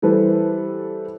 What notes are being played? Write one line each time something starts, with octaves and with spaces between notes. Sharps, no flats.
E3 G3 A4 B4 C5